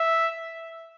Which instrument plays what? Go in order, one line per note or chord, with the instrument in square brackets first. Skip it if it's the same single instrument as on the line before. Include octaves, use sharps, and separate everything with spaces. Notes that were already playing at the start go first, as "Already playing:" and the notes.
Already playing: [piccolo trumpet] E5